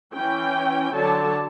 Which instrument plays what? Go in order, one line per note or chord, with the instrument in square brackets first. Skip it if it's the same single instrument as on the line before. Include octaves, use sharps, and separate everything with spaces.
[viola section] E3 C#4 G5
D3 F#3 A4 C#5 D5 A5